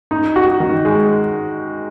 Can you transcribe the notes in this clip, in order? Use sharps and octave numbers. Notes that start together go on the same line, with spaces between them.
D#4
F#4
D#3
G#3